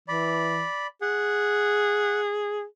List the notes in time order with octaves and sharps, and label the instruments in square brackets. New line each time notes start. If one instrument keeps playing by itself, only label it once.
[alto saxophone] E3 [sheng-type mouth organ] D5 B5
[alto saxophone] G#4 [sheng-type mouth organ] F#5